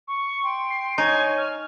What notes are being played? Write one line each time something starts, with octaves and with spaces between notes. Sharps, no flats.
C#6
G5 C6
C7
D#4 C#5 G#5 C#6
F6